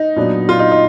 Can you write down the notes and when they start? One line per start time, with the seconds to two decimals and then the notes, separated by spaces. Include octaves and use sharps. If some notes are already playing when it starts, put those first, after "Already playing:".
Already playing: D#4
0.16 A#2 F#3 B3 D4
0.49 F4
0.59 D#4
0.71 D#4